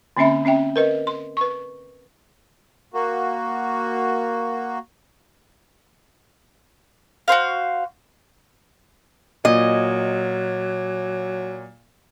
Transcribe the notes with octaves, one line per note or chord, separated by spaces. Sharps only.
D3 A#3 C4 C#4 E5 B5
C4 C#4 E5 G5
A#4 B4 D#5
C6
B4 C#6
A#3 F#4
F#4 A#4 C5 F5
A#2 F#3 D#5